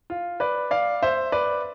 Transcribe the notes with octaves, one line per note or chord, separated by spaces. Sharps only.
F4
B4 D5
D5 F5
C5 E5
B4 D5